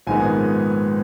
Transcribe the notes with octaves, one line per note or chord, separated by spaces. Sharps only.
A#1 G#2 D#3 G#3 B3 G#5